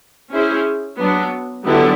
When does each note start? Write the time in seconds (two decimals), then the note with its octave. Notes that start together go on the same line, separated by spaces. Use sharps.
0.31 C#4 E4 G#4 C5
0.99 F#3 B3 D4
1.65 D3 F#3 B3 E4 G4